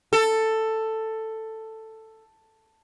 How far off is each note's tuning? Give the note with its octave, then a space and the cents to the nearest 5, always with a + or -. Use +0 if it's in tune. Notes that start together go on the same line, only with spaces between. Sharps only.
A4 +10